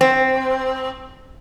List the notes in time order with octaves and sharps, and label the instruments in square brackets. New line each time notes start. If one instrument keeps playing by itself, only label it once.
[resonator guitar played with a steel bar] C4